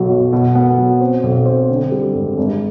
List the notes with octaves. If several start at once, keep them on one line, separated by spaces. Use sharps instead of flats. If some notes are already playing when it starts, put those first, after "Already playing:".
Already playing: B1 F#3
B2
B2
B3
F#3
C4
B1
C4
D3
G3
G#1
G#1